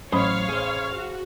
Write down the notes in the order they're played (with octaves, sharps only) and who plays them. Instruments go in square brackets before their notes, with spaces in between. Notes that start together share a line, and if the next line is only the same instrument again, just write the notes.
[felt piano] A1 B5 D#6 [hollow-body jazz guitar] F#3 C5 [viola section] C#5 F5
[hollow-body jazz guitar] G#4 C5
[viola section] F#4